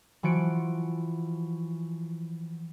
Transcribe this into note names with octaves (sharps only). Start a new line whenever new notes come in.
E3 F3 F#4 C#7 D7